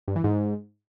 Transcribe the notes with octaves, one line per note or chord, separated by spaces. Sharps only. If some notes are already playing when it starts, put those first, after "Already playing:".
G2
E3
G#2